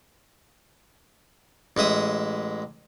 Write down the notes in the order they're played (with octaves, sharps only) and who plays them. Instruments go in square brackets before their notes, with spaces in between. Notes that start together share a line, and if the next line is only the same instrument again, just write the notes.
[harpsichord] A1 G#3 E5 D#6